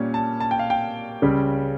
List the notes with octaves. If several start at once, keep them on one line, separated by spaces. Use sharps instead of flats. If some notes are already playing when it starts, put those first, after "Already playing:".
Already playing: A#2 G3 A#3 C#4
A5
A5
G5
F5
G5
C#2 C#3 G3